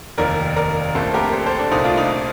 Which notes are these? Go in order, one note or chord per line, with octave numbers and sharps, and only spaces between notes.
F1 D#2 D#3 A#4 D5
A#4 D5
A#1 A#2 A3 C4 A4 C5
G4 A#4
A4 C5
A4 C5
D4
C2 A#2 A3 C4 D#4
D4 F4
D#4